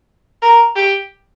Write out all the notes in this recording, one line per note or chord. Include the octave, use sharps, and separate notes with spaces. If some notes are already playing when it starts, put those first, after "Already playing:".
A#4
G4